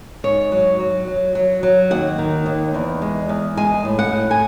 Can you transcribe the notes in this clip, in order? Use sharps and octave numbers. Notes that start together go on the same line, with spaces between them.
G#2 C#5
F#3
F#3
F#3
F#3
F#3
D#2 F#5
D#3
D#2
E2
G#3
E2
G#3 G#5
A2
F#5
A2
G#5